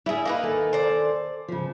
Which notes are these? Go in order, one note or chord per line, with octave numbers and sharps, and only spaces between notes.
G3 E4 G#4
A#3 D#4 B4
D#2 A4 G#5
C5 D5
C#3 F3